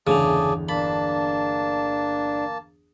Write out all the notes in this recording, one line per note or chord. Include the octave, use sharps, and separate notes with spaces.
G1 E2 C#3 A3 G#4 D5 F7
A#3 D4 A5 B5